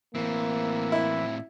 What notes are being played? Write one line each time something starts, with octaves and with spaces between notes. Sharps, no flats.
A2 E3 A#3 C4
E4